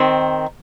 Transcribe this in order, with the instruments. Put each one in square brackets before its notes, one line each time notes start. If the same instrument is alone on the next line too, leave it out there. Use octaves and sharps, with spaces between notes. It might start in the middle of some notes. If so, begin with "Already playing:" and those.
Already playing: [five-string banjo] D#3 C4